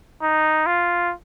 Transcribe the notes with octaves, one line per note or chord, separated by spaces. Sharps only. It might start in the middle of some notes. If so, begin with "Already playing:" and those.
D#4
F4